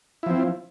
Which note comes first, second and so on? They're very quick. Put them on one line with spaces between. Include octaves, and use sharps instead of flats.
E4 F3 C4